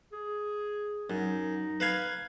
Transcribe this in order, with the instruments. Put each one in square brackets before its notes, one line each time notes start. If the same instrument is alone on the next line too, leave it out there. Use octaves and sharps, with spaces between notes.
[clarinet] G#4
[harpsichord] F#2 [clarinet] D#4
[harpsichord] B4 F5 G#5